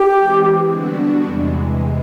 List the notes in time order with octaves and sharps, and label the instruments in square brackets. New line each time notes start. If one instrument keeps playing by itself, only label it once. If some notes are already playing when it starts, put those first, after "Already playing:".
Already playing: [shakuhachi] G4
[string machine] E3 G#3 C4
D3 G3 B3 D4 F#4
E2 C3 E3 G#3